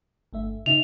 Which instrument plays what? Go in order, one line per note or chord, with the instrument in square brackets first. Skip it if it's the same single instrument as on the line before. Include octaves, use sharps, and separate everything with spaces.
[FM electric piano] G1 A3 E5
[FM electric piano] C#3 D#4 E5 [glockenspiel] F7